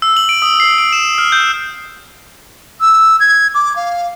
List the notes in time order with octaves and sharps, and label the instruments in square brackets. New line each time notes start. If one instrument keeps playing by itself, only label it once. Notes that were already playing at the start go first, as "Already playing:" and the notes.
[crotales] E6
F#7
D7
D#6
C7
D7
E7
F6
G6
[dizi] E6
G#6
D6
F5